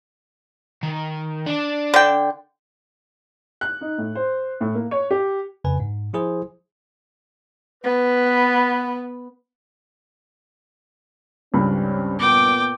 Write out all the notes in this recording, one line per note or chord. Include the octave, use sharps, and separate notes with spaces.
D#3
D4 D5
D3 G5
F#6
D#4
A2
C5
A2
A#3
C#5
G4
F2 C#3 B4 G#5
G#2
F3 E4 G#4 C5
B3 B4
C#2 G2 G3 C4 C#4 B5
A#2 B3 G5 D6